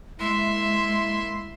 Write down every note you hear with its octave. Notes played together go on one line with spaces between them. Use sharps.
G#3 A#3 E4 E5 C6